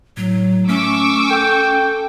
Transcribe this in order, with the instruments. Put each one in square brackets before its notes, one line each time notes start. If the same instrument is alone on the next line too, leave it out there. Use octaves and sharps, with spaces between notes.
[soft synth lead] A2 [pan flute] F#3
[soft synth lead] A3 [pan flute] C#4 [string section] C#6 D6 E6
[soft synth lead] A4 [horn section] G5